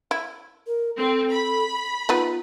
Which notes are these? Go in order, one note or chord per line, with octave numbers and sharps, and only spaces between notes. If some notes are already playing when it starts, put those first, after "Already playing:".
E4
A#4
C4 A4
B5
B3 D#4 F4 B4